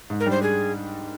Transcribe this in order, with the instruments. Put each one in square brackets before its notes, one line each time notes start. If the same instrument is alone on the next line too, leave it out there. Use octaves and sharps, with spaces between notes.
[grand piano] G#2
[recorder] A#4
[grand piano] G3 D4 [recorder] C5
[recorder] G#4